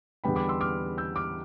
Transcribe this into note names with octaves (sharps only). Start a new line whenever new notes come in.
E2 D3 G3 B3 G5 B5
B5 D6
C6 E6
D6 F6
E6 G6
D6 F6